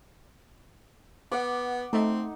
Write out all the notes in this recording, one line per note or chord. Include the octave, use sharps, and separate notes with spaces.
B3 F#5 D6
A3 C4 D#4